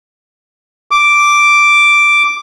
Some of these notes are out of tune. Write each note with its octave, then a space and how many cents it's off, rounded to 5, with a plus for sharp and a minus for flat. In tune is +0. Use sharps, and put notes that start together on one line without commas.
D6 +0